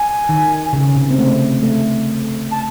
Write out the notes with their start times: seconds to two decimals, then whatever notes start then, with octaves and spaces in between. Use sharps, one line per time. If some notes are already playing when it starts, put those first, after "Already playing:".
Already playing: G#5
0.29 D#3
0.73 C#3
0.96 C3
1.11 C4
1.19 A3
1.63 A3
2.51 A5